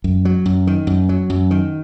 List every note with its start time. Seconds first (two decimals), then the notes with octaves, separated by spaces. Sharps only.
0.04 F#2
0.25 F#3
0.46 F#2
0.67 D#3
0.87 F#2
1.09 F#3
1.30 F#2
1.51 D#3